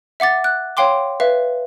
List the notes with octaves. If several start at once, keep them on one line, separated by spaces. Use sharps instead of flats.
E5 F#5 D6 A6
F#6
C#5 F5 G5 C6 D6
B4 E5 F5